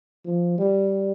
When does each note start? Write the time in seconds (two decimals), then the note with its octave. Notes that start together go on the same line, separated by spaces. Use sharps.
0.25 F3
0.58 G3